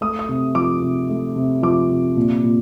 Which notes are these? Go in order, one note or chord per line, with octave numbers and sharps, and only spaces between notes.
A3 D#6
D#6
C3
F3 D6
C3
A3
C3
F3 D6
C3
A#2
A#2